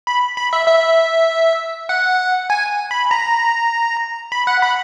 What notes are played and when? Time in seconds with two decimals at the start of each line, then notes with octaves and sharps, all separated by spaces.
0.07 B5
0.37 B5
0.53 E5
0.68 E5
1.89 F#5
2.50 G#5
2.91 B5
3.11 A#5
4.32 B5
4.47 F#5
4.62 B5